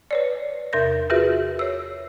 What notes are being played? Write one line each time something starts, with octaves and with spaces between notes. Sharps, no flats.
B4 C#5 D5
E2 C3 A#4 G6 A#6
F4 F#4 G#4 B4 E5
C#5 E6